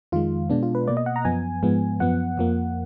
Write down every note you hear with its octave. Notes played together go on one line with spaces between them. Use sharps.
F2 D#3 G#3 F4
B2 G#3 B3 D4
F4
B4
B2 A#3 D5
D#5
F#5
A#5
F#2 F3 B3 G#5
G#2 F3 G#3 B3
F#2 F3 B3 F#5
F2 F3 A#3